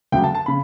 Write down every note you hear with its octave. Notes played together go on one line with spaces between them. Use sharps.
D2 C#3 F#3 G5
A5
A5
C#3 B5